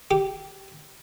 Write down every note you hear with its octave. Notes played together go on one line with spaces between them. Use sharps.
G4